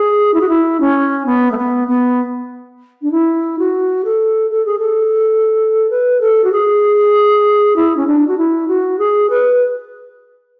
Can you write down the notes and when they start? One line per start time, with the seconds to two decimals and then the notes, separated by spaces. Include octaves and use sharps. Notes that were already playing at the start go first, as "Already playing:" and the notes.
Already playing: G#4
0.34 E4
0.41 F#4
0.48 E4
0.80 C#4
1.26 B3
1.51 A3
1.57 B3
1.88 B3
3.02 D4
3.11 E4
3.59 F#4
4.04 A4
4.50 A4
4.65 G#4
4.78 A4
5.90 B4
6.20 A4
6.44 F#4
6.52 G#4
7.76 E4
7.96 C#4
8.07 D4
8.27 F#4
8.37 E4
8.68 F#4
8.98 G#4
9.30 B4